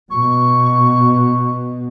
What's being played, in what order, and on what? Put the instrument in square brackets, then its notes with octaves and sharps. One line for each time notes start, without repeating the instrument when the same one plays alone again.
[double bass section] B2 [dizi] C#6